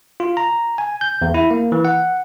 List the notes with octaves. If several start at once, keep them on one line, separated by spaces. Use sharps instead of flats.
F4
A#5
G#5
G6
E2
E4
A#3
E3
F#5